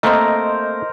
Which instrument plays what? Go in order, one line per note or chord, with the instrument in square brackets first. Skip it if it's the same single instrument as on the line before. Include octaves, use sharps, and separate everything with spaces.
[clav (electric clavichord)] A3 A#3 C4 [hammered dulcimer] A#4 C5 [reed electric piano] D#5